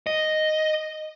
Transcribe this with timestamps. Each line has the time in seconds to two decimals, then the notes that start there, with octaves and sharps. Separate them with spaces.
0.07 D#5